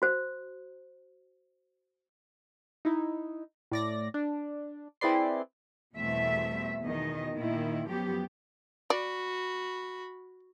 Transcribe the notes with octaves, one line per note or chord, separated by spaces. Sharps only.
F#4 C5
D#4 E4
A2 D5 A#6
D4
C4 E4 G#4 B4 D5 C6
E2 B2 G3 A3 C4 E5
E2 B2 D#3 D#5
A#2 D#3 E4
F#2 F3 F#3 B3 G4
F#4 D5 B5